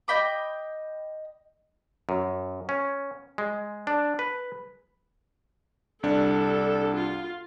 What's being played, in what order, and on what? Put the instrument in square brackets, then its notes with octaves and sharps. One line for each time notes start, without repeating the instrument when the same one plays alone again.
[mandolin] D#5 G5 B5 D6
[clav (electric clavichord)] F#2
C#4
G#3
D4
B4
[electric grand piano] C2 D4 [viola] A4
[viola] F4